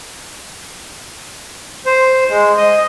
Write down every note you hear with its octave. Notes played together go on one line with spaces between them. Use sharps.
C5
G#3
D#5